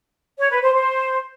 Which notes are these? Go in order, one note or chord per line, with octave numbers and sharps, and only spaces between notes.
C#5
B4
C5
C5